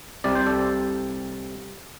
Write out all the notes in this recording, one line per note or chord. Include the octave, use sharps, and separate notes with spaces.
C2 C3 G3 D5
C5
A4 D5